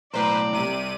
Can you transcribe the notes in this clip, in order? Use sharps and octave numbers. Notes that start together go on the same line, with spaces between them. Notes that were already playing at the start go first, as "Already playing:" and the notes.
B1 A2 B4 C5 D5 A#5
C2 C3 D#7